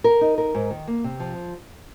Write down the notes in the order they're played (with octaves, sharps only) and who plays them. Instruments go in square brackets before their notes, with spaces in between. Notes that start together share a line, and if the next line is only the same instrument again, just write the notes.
[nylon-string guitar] A#4
D#4
A#4
G#2
D#3
A#3
C3
F3